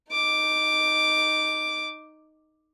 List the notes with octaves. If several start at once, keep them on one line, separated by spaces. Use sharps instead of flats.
D#4 D6